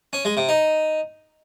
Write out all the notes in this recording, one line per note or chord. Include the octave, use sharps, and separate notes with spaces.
C#4
G#3
C3
D#4